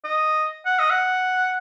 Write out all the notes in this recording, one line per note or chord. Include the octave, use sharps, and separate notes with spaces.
D#5
F#5
D#5
F#5